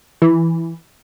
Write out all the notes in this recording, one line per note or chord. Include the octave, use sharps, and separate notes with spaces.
E3